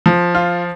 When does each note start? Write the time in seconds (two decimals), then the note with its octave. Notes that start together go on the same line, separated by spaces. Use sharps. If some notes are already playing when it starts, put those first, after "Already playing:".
0.06 F3
0.35 F4